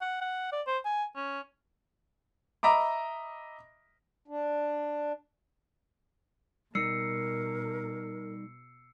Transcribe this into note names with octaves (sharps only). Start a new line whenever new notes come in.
F#5
F#5
D5
C5
G#5
C#4
D#5 E5 A#5 B5 D6
D4
B2 G3 D#4 A#4 D#5 E6 C7 C#7